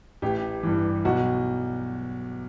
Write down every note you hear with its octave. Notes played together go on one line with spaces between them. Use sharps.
A1 G4
G2 E3
B1 F#4